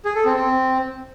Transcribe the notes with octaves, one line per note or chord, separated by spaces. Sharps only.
G#4
A4
C4
C4